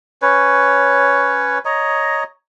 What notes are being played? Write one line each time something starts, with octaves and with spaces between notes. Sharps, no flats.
C#4 B4 C#5
C#5 D#5 A#5